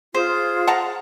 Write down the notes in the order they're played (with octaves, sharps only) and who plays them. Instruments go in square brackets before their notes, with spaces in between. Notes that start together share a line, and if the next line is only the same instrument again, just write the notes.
[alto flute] F4 [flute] G#4 [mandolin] C5
[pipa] F#5 A5 A#5